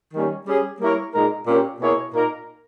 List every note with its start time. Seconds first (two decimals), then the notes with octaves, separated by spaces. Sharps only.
0.14 D#3 G3 A#3 C#4
0.47 G3 C#4 G#4
0.80 G3 A#3 E4 A#4 C#5
1.14 A#2 G#3 D#4 A#4
1.47 A#2 A#3 C#4 G4
1.81 B2 A#3 E4 G#4 C#5
2.14 A#2 A#3 D#4 A#4